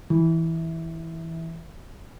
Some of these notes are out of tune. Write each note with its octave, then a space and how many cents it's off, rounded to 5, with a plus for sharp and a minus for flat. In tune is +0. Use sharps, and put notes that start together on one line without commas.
E3 -10